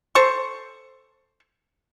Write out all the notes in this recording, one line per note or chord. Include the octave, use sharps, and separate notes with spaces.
A4 C5 C#6